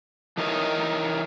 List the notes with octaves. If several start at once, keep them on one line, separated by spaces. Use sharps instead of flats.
E3 A3 D#4 A#4 C#5 D#5